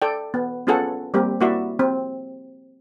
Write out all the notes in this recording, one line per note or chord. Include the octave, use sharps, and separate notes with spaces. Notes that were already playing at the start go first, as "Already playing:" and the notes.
A4 D5 G5
B3
B3 C#4 F4 G#4 A4 F#5
G3 A#3 C4 G4
A#3 E4 F#4 D5 E5
C4